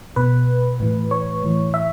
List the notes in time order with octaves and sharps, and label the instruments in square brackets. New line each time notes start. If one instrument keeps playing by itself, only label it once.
[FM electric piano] B2 B4
A2 E3
C#5
A2 E3
E5